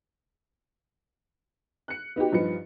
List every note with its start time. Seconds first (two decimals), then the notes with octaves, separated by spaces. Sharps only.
1.88 F#6 C#7
2.16 B3 D#4 F#4 G4
2.32 G2 F3 D#4 B4 C#7